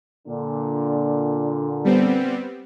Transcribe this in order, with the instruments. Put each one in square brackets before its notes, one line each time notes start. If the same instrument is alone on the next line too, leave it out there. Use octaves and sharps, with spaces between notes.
[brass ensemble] A#2 D3
[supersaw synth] G3 B3 C4